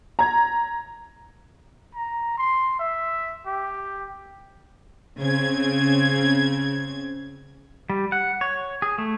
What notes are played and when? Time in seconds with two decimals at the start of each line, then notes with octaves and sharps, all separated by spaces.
0.19 A#5 G#6
1.95 A#5
2.38 C6
2.79 E5
3.47 G4
5.20 C#3 C4 G#6
7.90 G3
8.12 F#5
8.41 C#5
8.82 G#4
8.98 A3